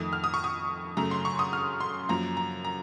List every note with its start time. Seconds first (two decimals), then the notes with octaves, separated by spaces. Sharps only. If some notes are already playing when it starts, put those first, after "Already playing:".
Already playing: F2 D#3 A3 D#6
0.13 F6
0.24 D#6
0.34 C#6
0.44 D#6
0.97 F#2 C#3 A3 A#5
1.11 C6
1.25 C#6
1.39 D#6
1.53 F6
1.80 C6
2.09 F#2 F3 A#3 A#5
2.37 A#5
2.65 A#5